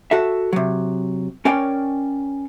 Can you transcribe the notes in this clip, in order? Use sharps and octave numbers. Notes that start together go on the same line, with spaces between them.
F#4 A4 E5
C3 F#3
C#4 A#4 C#5 D5 G5